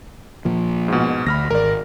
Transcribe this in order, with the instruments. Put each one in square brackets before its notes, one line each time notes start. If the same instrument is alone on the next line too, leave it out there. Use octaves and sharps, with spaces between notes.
[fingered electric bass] A#2 F3
[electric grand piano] G#2 B2
[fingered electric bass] D2 [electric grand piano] B5 F6 A#6
[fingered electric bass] G#1 [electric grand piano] A#4 D5